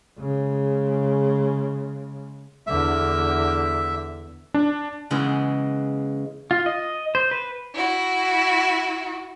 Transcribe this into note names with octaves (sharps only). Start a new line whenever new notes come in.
C#3 G#3
E2 D3 E5
D4
C#3 E3 G#3 B3
F4
D#5
C5
B4
E4 F#4